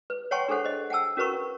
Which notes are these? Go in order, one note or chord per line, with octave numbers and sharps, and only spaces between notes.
B4
C#5 F#5 G5 A5 C6 C#6
D4 G#4 A4 C5 F#5
C5 D#5
F#5 G5 A5 E6
C#4 F#4 A#4 B4 A#5 C#6